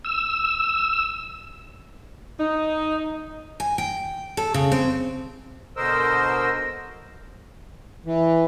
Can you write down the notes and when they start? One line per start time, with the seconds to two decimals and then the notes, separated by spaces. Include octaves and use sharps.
0.05 E6
2.39 D#4
3.60 G#5
3.78 G5
4.37 A4
4.54 C#3
4.72 C4
5.77 B2 D3 A#4 C5 D#5 E6
8.06 E3